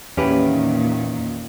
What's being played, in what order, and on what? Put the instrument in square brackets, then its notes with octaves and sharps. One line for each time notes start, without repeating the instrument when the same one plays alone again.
[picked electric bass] E2 [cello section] A#2 D#3 [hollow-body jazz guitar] C#4 G4 B4